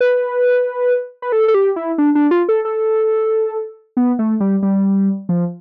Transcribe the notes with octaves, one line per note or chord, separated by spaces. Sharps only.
B4
B4
A4
A4
G4
E4
D4
D4
F4
A4
A4
B3
A3
G3
G3
F3